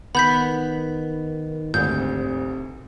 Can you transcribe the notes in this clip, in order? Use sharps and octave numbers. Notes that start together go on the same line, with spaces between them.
D#3 B3 B5 G6 B6
G#1 D2 C3 G6